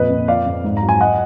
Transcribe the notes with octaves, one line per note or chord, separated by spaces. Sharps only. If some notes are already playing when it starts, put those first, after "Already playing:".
Already playing: F2 A#2 B4 D#5
F2
F3 D5 F5
F2
G#2
A#5
F#3
G#5
D#5 F#5